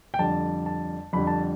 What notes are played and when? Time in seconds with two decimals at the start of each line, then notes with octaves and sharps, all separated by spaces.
0.14 G5
0.19 F2 D3 G3 A5
0.66 A5
1.13 F2 D3 G3 B5
1.27 A5